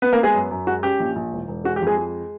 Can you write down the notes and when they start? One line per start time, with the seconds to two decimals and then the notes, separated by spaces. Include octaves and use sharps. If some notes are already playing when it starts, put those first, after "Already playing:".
0.02 B3 B4
0.13 A#3 A#4
0.18 B3
0.23 G#3 G#4
0.34 F#2
0.51 F#2
0.67 G#3 F#4
0.83 C#4 G4
1.00 A#1
1.16 A#1
1.32 E1
1.48 E1
1.64 G#3 F#4
1.76 G4
1.82 F2
1.87 G#3 G#4
1.97 G#3